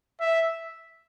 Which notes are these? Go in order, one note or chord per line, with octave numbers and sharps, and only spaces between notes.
E5